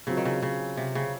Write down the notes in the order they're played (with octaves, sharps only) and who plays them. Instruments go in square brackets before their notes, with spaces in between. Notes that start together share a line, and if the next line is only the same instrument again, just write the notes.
[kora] C#3 [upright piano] F#3 C4 F4
[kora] D#3
C#3
C#3
C3
C#3